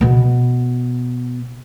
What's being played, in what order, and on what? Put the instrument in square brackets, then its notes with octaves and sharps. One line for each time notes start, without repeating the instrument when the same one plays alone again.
[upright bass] B2 B3